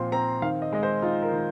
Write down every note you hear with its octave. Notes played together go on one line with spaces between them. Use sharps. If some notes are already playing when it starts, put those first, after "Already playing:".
Already playing: A#2 F3 C4 C6
C4 A#5
D#3 F5
D#5
G#3 D#5
C5
D#4 F4
A#4
D#3